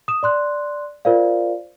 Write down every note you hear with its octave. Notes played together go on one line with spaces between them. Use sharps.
D#6 E7
D5 C6 F#6
F4 A#4 C5 D5 F5